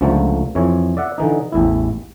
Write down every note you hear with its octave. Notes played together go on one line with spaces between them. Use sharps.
C#2 D3 F3 A3 A#3 A5
F2 E3 C#5
D5 E5 F#5
D3 E3 D#4
A1 E2 E4